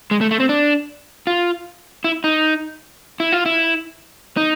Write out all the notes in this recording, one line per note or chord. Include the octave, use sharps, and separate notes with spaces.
G#3
A3
A3
C4
D4
F4
E4
D#4
E4
F4
E4
D#4